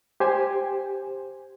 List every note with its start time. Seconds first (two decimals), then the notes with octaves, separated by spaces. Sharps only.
0.20 G4 C5 G#5